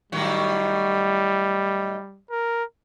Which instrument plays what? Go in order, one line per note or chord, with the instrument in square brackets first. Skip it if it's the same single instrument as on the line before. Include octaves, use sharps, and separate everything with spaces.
[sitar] A2 D#3 F#3 [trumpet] G3
[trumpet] A#4